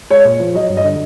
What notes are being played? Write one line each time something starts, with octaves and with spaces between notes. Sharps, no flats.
G#3 C#5
A#2
F3
F#3 D#5
G2
D#5
D3